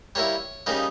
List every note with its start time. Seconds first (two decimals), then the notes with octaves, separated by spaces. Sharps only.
0.15 G3 A#3 E4 C#5
0.66 C#3 G3 A#3 D#4